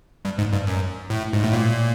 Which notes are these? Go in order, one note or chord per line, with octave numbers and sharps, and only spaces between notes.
G2
G#2
G2
F#2
A2
G#2
A2
A#2